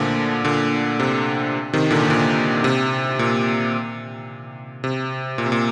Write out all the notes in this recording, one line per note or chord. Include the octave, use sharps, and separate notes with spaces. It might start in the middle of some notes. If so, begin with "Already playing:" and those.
Already playing: A#2 D3 F3 A3
A#2 D3
C3
C3 D#3
A#2 D3
A#2 D3
C3
A#2
C3
A#2
C3
A#2